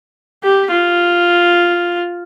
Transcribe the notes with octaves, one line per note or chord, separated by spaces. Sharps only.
G4
F4